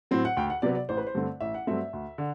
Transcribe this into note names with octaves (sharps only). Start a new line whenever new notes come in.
A2 F#3 C4
F#5
D2 G5
F#5
C3 F#3 B3 D5
D5
A1 C5
B4
C5
G2 D3 A3 C4
A1 E5
F#5
G2 F#3 A3 C4 E5
D2
D3